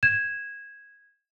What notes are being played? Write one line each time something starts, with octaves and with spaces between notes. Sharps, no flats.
G#6 E7